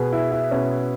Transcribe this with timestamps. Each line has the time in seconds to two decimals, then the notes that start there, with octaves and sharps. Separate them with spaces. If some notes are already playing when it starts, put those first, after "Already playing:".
Already playing: B2 G#4 B4
0.13 E4
0.32 E4
0.51 B2 C#4